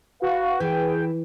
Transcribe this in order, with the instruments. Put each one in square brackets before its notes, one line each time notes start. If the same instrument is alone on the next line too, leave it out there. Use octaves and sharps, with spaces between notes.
[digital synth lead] F#4 [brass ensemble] B4 F5
[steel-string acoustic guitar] E3 [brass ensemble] G#4 B4 [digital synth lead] G5